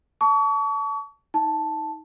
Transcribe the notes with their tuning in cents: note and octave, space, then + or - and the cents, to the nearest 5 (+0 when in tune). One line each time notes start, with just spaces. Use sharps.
A5 +0 C#6 +40
D#4 +25 A5 +0